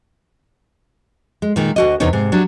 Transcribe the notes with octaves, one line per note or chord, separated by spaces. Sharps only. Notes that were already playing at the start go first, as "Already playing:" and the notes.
G#3
A#2 D#3 G#3
D2 F#4 D#5
E2 C3 B3 D#4 C#5
G#2 C3
F#3 G3 D4